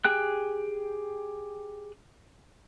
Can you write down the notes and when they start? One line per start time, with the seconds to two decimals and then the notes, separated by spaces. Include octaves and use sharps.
0.05 G4 G#4 G5 F#6